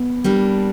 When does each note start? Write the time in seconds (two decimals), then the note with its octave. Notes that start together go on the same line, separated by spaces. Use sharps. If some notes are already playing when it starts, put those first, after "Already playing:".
Already playing: B3
0.24 G3 A#3 D4